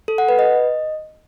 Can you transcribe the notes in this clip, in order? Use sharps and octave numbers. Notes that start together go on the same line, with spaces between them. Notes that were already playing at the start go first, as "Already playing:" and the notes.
A4
F#5
B4
D#5